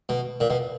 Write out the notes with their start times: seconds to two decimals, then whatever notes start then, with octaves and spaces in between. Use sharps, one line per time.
0.09 B2
0.40 A#2
0.50 B2